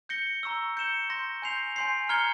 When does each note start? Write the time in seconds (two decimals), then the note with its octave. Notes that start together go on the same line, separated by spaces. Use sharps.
0.09 G6 A#6 C#7 G7
0.43 A#5 C#6 E6
0.77 G6 C#7 E7 G7
1.10 C6 G6 A#6
1.42 G#5 C6 G6 C7 F7
1.76 G#5 C6 G6 C7
2.09 A#5 F6 G#6 C#7 G7